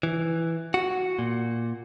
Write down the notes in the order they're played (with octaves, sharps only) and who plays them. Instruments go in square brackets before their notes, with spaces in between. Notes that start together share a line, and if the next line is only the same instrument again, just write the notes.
[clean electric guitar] E3
F#4
A#2